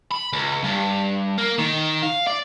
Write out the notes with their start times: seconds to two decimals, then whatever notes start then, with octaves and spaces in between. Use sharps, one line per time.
0.12 B5
0.33 C#2
0.63 G2
1.38 A#3
1.58 D#3
2.02 F5
2.27 D5